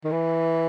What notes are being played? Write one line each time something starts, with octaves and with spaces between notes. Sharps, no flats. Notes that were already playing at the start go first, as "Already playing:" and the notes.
D#3
E3